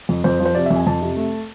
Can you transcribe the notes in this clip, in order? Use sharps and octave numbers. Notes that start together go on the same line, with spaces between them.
F2
F2 C5
F3
C5
C3 D5
F2 E5
G#5
F2 A5
C3
A3